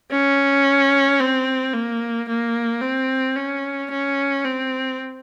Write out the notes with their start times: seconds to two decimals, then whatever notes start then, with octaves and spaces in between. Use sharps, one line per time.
0.12 C#4
1.20 C4
1.74 A#3
2.29 A#3
2.82 C4
3.36 C#4
3.91 C#4
4.44 C4